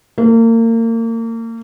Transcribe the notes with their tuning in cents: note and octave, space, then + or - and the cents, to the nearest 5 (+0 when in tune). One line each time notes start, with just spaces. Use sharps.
A#3 -35